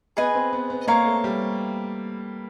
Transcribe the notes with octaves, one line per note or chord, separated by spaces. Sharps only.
B3 G#4 B4 D#5 G#5
C4
B3
B3
A#3 C#5 F5 A#5 C#6
A3
G3